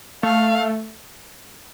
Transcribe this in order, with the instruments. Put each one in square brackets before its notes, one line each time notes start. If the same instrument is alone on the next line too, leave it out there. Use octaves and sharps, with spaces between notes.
[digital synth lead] A3 [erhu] F5